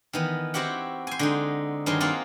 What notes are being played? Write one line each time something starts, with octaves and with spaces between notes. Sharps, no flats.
D#3 E3 B3
C4 E4 F#4 G4 F#5
C5 G#5
D3 G#3 D#4
G2 D#3 F#3 G#4 C6
A#3 C4 F4 G#4 F#5